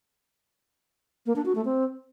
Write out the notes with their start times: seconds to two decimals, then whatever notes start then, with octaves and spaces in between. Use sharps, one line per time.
1.26 A#3
1.36 D4
1.46 F#4
1.55 A3
1.65 C4